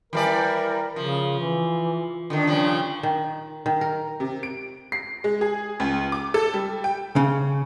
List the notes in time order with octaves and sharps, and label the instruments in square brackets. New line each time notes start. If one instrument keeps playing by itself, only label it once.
[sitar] E3 G3 D5 [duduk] A#4
[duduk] C#3 [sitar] F3
[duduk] E3
[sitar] D3 D#3 [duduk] D4
[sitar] G2 C#3 F3
[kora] D#3
D#3
A#4
[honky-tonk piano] C3
D7
C7
G#3
G#4
C#2
D6
A4
G3
G5
[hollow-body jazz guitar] C#3